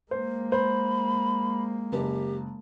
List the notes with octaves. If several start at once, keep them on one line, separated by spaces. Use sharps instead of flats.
G#3 A#3 C5
C5 B5
F#1 G4